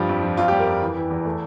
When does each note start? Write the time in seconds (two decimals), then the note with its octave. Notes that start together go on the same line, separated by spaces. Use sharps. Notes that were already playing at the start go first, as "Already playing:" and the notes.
Already playing: G2 F3 G4
0.09 F2
0.23 F3
0.37 F2 F4
0.48 G4
0.52 G3
0.59 A#4
0.67 F2
0.82 E3
0.97 E3
1.10 E2
1.26 A3